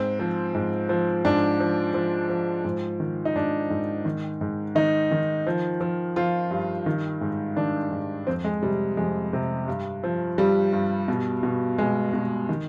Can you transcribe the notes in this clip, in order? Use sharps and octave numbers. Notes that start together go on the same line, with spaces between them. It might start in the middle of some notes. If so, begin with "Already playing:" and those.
Already playing: G#2 C4
F3
G#2
F3
G#2 D4
F3
F3
F3
G#2
D#3
D#4
G#2 D4
G#2
D#3
G#2
D#3 D#4
D#3
F3
F3
F3 F4
G2
D#3
G#2
D#3 D4
G#2
F2 C4
G#3
C3 G3
F2 G#3
C3
G2
F3
G2 G3
G2
B2
B2
B2 G#3
B2
D#3